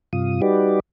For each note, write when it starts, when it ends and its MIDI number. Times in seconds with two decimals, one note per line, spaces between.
0.13 0.41 43
0.13 0.41 48
0.13 0.41 65
0.13 0.41 87
0.42 0.80 55
0.42 0.80 63
0.42 0.80 66
0.42 0.80 67
0.42 0.80 71
0.42 0.80 74